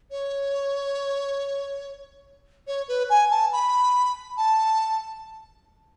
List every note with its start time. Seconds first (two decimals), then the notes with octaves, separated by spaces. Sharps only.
0.11 C#5
2.67 C#5
2.88 B4
3.10 G#5
3.31 A5
3.53 B5
4.38 A5